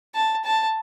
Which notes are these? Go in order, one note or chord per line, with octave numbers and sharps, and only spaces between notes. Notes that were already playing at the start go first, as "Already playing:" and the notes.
A5
A5